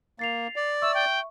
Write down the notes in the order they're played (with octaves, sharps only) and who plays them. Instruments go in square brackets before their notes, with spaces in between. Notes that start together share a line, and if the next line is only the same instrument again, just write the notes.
[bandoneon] A#3 [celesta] A6 C7 F7
[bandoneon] D5
[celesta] E5 C#6 [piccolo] E6
[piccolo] G5